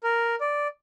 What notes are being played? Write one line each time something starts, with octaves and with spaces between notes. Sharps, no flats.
A#4
D5